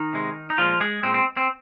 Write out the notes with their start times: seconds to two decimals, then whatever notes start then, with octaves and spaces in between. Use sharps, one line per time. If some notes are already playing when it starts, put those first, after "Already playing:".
Already playing: D#3 D#4
0.13 C3 G#3
0.50 D#4
0.58 A#2 F3 G#3 F4
0.80 G#3 G#4
1.03 A#2 G#3 C4
1.14 C4
1.37 C4